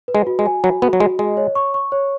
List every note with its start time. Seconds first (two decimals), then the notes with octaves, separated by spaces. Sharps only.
0.08 B4
0.15 G#3
0.27 F#4
0.39 G#3
0.46 G#5
0.64 F#3 F#4
0.82 B3 F#4
0.93 F#3
1.00 G#3 F#4
1.19 G#3 D#5
1.37 C#5
1.55 C#6
1.74 C#6
1.92 C#5